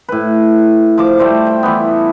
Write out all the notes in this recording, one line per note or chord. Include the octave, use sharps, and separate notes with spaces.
A2 B4
F3 D6
G3 A3 C5 D5
G5
E3 B3